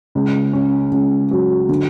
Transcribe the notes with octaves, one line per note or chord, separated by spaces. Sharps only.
C#2
C#4
C#2
F#3
D3